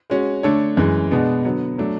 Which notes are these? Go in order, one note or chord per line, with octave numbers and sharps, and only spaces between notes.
G#3 C#4 F#4
D3 A3 D4 A4 C#5
F#2 E3 G#3
B2 G#3 B3 D4
D3 F#3 B3
F#3 A3 D4